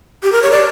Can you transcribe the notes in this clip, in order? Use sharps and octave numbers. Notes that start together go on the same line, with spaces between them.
G4
A#4
C#5
D5